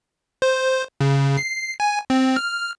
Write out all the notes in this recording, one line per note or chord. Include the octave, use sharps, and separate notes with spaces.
C5
C#3
C7
G#5
C4
F6